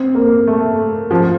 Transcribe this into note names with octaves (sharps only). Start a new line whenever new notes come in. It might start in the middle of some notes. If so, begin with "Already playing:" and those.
Already playing: C4
A#3
A3
F3